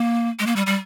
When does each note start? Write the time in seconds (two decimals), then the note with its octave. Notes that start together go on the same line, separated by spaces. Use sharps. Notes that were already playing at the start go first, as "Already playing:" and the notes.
Already playing: A#3
0.39 G#3
0.46 A#3
0.56 G3
0.66 G3